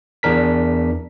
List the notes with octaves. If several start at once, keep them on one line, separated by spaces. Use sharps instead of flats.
E2 D4 A#4 B6